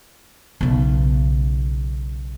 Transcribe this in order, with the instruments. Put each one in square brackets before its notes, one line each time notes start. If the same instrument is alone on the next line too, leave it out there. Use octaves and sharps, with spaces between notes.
[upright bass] B1 C#3